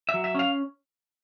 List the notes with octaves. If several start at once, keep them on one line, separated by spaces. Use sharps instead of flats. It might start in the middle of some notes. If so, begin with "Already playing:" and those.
E5
F#3
E5
C#4 F5